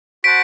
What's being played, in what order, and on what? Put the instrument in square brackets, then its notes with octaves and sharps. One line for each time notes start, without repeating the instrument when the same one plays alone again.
[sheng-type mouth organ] F#4 C5 F#5 A5 [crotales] B6 D7